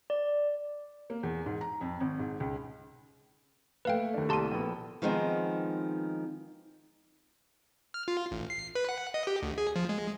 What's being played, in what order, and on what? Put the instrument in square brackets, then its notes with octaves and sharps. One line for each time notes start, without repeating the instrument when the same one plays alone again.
[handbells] D5
[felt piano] A#3
E2
G#2
A#5
F2
G#1
G#2
C#2
[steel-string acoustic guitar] A3 A#3 [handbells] B4 F5 G5
[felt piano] D#2 D4
[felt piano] C2 D#7 [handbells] G4 A5 C6
[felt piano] A#1 B3
[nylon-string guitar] D#3 F3 G#3 B3 C4 D#4
[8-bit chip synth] F6
F4
A1
C7
B4
F#5
D#5
G4
D2
G#4
F3
G#3